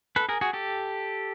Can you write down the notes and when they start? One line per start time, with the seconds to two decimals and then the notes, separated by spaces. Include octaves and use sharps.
0.16 A4 B4
0.29 G#4 A#4
0.41 F#4 G#4
0.53 G4 A4